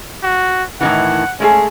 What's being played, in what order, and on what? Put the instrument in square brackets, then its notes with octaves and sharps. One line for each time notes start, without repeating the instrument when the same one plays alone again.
[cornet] F#4
[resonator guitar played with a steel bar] A2 D#3 E3 [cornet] F#5
[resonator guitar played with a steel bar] G#3 A3 G#4 [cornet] C#4